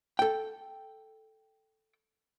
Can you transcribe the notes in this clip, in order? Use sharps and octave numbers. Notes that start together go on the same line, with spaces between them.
A4 G5